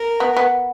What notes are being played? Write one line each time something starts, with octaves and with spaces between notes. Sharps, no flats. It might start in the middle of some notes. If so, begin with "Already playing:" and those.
Already playing: A#4
B3
B3